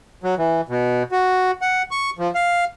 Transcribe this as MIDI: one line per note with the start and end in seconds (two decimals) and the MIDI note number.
0.23 0.35 54
0.38 0.61 52
0.69 1.03 47
1.12 1.51 66
1.62 1.82 78
1.91 2.10 85
2.19 2.31 53
2.35 2.65 77